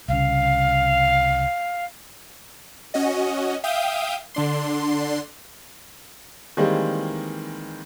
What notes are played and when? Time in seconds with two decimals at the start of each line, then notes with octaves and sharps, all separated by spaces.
0.08 C2 C#3 F5
2.94 C#4 F#4 D#5
3.64 E5 F5 G5 D#6 G6
4.34 D3 D4 C6
6.57 D#3 E3 G3 G#3 A#3 C4